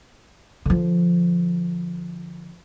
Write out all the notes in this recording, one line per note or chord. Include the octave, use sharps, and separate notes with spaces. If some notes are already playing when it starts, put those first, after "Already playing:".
D3 F3